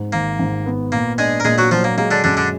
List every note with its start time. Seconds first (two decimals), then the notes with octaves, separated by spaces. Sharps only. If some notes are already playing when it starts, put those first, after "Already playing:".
Already playing: G#2
0.13 G#1 A#3
0.39 G#2
0.66 B3
0.92 A#2 A#3
1.18 G#3 D4 G#4
1.40 A#4
1.45 A#2 G#3 G#4
1.58 F#3 F#4
1.71 F3 F#3 F4
1.84 A#3
1.97 G#3 A#3
2.11 D3 D4
2.24 F#2 D3 D4
2.37 D3 D4